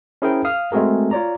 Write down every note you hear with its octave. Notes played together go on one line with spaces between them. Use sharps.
C#4 E4 G#4 A#4 C5 G5
F5 D#6 F6
G#3 A3 C4 F#4 G#4 A#4
F4 C#5 D5 A#5